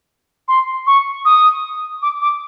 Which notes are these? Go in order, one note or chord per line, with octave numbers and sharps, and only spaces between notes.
C6
C#6
D#6
D6
D6